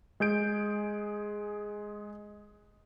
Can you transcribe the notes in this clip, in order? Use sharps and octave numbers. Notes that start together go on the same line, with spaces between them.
G#3 G#4 G6 D7